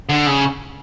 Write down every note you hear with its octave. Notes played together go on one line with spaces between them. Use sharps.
D3
C#3